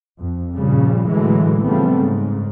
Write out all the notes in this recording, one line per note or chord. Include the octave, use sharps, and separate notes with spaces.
F2
G2 A#2 C#3 F3 G3
A2 D3 E3 F#3 G#3 A3
C#3 F3 G3 A3 B3 C4
G#2 C#3